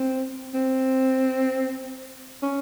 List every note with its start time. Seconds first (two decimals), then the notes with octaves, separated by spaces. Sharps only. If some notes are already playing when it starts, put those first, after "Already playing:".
Already playing: C4
0.54 C4
2.43 C#4